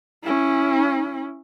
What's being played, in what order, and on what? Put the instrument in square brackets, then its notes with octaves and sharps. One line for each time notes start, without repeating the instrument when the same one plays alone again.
[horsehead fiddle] C#4 E4